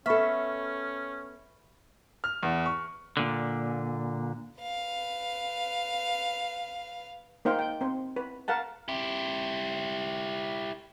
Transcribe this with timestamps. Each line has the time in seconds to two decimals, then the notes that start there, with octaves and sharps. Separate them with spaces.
0.06 B3 C#4 A4 E5 B5 C#6 F6
2.24 F6
2.43 E2
2.66 C#6
3.17 A#2 D3
4.61 B4 F5
7.45 A#3 D#4 C5 F5 G5
7.59 G5
7.81 C4 C5
8.16 B4
8.48 A#4 F5 F#5 A5
8.88 E4 G4